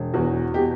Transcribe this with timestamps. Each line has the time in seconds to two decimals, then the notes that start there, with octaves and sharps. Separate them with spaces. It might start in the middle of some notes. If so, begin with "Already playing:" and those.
Already playing: E1
0.14 E2 F#4
0.54 B2 G4